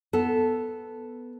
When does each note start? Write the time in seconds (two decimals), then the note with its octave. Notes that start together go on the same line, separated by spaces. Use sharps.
0.13 B3 A4